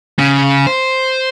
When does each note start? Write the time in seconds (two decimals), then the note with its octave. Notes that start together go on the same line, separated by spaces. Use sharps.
0.19 C#3
0.67 C5